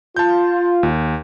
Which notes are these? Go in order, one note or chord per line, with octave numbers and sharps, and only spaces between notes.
F4 A5 G6
D#2